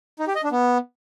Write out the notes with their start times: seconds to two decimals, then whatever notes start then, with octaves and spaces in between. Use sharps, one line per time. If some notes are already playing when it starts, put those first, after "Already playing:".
0.19 D#4
0.27 G4
0.36 D#5
0.44 D4
0.52 B3